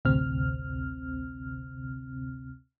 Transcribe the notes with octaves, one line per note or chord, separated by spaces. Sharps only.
A1 D2 C3 C4 F6